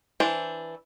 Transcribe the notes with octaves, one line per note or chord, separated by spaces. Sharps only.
E3 D4 C5